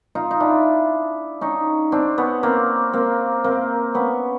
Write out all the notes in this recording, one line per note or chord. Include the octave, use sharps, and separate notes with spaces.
D#4 F4
D#4
D4 E4
C#4 D#4
C4 D4
B3 C#4
A#3 C4
A#3 C4
A#3 C4
B3 C#4